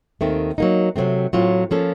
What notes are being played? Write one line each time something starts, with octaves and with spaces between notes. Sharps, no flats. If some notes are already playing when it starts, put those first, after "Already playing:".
D#2 D#3 A3 C4
F#3 A#3 D#4
C3 D#3 F#3 A3 C4
A2 F#3 C4 F4
F3 A#3 C#4 A4